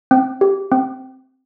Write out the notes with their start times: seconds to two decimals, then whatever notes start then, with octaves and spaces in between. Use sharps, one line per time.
0.11 C4
0.41 G4
0.72 C4